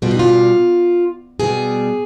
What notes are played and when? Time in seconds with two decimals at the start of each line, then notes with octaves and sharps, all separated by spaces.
0.02 B2 G3 F4
0.11 D#4
0.19 F4
1.40 B2 G3 G#4